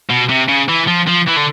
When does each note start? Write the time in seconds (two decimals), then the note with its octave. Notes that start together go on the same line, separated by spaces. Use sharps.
0.10 B2
0.29 C3
0.48 C#3
0.68 E3
0.87 F3
1.07 F3
1.27 E3
1.36 D3